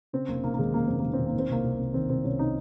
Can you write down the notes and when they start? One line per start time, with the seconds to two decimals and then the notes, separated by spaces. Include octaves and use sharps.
0.13 C#3 C4
0.28 F1 A#3
0.44 F1 A#3
0.54 A#3
0.58 D#2 G#3
0.74 C#3 A#3
0.87 F1 C4
1.00 F1 A#3
1.13 C4
1.19 D#2
1.26 A#3
1.34 D#3 C4
1.49 C2 A#3
1.64 C2
1.79 C3
1.94 D#3 C4
2.09 C2 C4
2.24 C2 C#4
2.39 C3 D#4